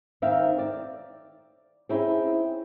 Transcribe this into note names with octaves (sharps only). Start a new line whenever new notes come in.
D#3 C4 D#4 E5 F5
D5
C4 C#4 D#4 E4 G#4